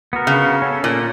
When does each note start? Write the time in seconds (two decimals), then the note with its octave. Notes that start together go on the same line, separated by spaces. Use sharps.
0.13 B3 F#4 A#4
0.27 C#3
0.62 C#4 A4
0.84 A#2